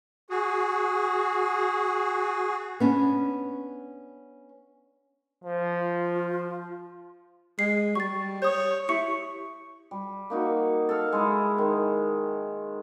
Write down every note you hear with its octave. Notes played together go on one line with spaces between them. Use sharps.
F#4 G#4
B3 C#4 D4
F3 C5
F4
G#3 C7
G3 C#6 A6
C#5 D#6 G6
E4 G4 C#6 C#7
G3
A#3 D#4 F#4
A4 A#4 F5
G#3 E4
D#3